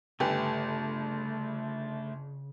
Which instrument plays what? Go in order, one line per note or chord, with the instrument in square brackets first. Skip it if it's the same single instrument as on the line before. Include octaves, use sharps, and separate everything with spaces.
[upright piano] G1 [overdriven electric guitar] C#3 [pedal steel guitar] A3 [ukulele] G4 B4 G#5